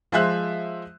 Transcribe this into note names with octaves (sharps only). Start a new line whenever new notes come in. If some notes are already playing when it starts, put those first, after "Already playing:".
F3 G#3 C5 E5 F#6